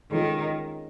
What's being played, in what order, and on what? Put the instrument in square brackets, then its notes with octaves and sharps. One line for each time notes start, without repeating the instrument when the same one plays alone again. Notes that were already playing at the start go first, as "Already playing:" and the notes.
[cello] D#3 [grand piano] G#3 C#4 F4 G#4